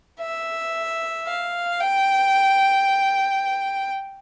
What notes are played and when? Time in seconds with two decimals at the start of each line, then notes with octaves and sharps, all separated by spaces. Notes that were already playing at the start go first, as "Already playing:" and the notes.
0.20 E5
1.26 F5
1.80 G5